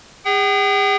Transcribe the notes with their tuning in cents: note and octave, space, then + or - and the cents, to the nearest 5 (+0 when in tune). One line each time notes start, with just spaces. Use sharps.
G#4 -40 G5 -40